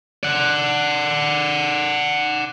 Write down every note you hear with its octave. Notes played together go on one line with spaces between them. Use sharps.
D5 F#5